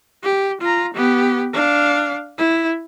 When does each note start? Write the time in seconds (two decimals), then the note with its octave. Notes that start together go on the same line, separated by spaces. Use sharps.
0.23 G4
0.61 F4 A#5
0.94 B3 G4
1.53 D4 F5
2.38 E4